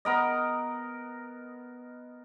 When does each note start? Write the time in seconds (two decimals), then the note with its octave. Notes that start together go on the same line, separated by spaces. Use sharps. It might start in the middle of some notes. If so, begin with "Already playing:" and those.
0.05 B3 A#4 D#5